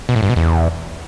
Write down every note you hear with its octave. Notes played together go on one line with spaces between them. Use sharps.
B2
A2
G2
B2
E2